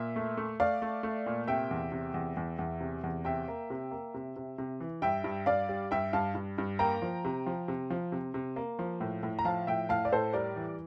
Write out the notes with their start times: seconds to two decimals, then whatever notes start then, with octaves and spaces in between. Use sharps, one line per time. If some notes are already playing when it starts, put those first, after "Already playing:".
Already playing: A#2 E5
0.16 A3
0.37 A3
0.60 A3 D5 F5
0.82 A3
1.03 A3
1.26 A#2
1.48 C3 E5 G5
1.71 E2
1.92 C3
2.14 E2
2.37 E2
2.59 E2
2.81 C3
3.03 E2
3.25 C3 E5 G5
3.48 A#3
3.70 C3
3.91 A#3
4.14 C3
4.36 C3
4.58 C3
4.80 E3
5.02 G2 E5 G5
5.24 G2
5.46 G2 D5 F5
5.69 G3
5.91 G2 E5 G5
6.13 G2 F5 A5
6.35 G2
6.58 G2
6.79 A#3 G5 A#5
7.02 F3
7.25 C3
7.46 F3
7.68 C3
7.90 F3
8.12 C3
8.34 C3
8.56 A#3
8.79 F3
9.01 A2
9.23 A2
9.39 A#5
9.45 F3 F5 A5
9.67 A2 E5 G5
9.89 A2 F5 A5
10.05 D5
10.12 A2 A4 C5
10.33 G3 A#4 D5
10.56 E3